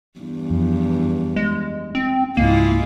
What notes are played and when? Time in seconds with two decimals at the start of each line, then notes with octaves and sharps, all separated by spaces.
0.19 E2 G2
0.50 F2
1.36 G#3
1.95 C4
2.37 C#2 G#2 G#3 A#3 E4 F4